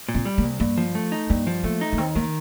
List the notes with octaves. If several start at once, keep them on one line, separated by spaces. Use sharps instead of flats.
A#2
C4
G3
A#3
C2
G2 A#3
F3
A3
D#4
G2 A#3
F3
A3 A#3
D#4
A#3
D#2 C4
D#3 A#3